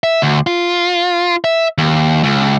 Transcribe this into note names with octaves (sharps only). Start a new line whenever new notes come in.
E5
D2
F4
E5
D#2
C#2